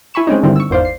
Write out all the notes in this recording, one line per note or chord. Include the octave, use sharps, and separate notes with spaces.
E4 G#5 B5 C#6 E7
G#3 C4 C#4 D#4
G2 D3 D#3 G3 C4 E4
C#6 E6
G#1 E2 C5 D5 F5
C7